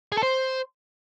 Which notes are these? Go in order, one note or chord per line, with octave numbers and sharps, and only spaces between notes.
G#4
A4
C5